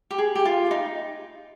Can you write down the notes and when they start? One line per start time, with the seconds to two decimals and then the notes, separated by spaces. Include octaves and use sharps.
0.11 G4
0.18 G#4
0.35 G4
0.45 F4
0.71 D#4